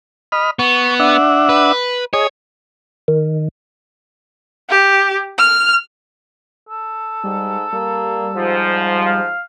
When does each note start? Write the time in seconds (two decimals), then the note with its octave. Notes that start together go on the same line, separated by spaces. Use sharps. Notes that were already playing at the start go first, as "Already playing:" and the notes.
0.32 D#5 B5 F6
0.59 B3 C#6
0.99 D4 E5 F#5
1.49 B4
2.13 G#4 C#5 D#5
3.08 D#3
4.69 G4
5.38 F6
6.69 A4
7.24 G#2 G3
7.73 G3 A#3
8.37 G#2 F3
9.06 F5